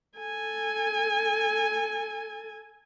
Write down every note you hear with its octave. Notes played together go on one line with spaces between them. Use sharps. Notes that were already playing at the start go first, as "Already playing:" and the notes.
A4 G#5